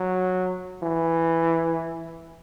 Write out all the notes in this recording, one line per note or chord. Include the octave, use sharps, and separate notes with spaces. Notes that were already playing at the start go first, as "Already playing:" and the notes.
Already playing: F#3
E3